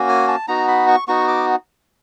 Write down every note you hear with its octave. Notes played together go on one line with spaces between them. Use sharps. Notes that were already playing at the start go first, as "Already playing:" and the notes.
Already playing: A#3 C#4 F#4
G#5
A5
B3 D#4 F#4 A#5
B5
C#6
B3 D#4 F#4 C#6
D6